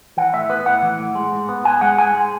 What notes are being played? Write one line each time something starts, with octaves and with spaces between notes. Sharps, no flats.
E3 F#5
A2 E5
B3 B4
A2 F#5
E3
A2
G#3
G#2
B3
G#2 G#5
G#3 F#5
G#2 G#5
G#3